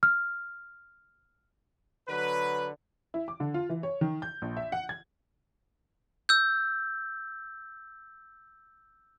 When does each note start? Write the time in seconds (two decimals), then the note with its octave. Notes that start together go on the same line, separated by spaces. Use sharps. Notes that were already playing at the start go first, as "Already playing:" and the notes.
0.03 F6
2.09 D3 F#3 B4
3.14 E4
3.28 D6
3.40 D3
3.54 F4
3.69 E3
3.83 C#5
4.01 D#3
4.22 G6
4.42 A#1
4.57 E5
4.72 F#5
4.89 G#6
6.29 E6 G6